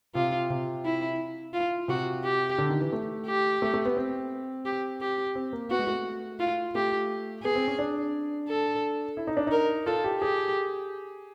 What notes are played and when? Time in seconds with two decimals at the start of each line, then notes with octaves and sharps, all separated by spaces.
0.15 C3 F4
0.50 C3
0.85 E4
1.53 F4
1.88 C3 F#4
2.24 G4
2.58 D3
2.70 D#3
2.81 E3
2.93 A3
3.27 G4
3.62 A3
3.74 A3
3.85 B3
3.97 C4
4.66 G4
5.01 G4
5.35 C4
5.53 A#3
5.71 B3 F#4
5.79 G#3
5.87 A3
6.39 F4
6.75 A3 G4
7.43 B3 G#4
7.55 C4
7.68 C#4
7.79 D4
8.48 A4
9.17 E4
9.27 D#4
9.37 D4
9.47 D#4 A#4
9.86 F4 A4
10.04 G4
10.21 G4 G#4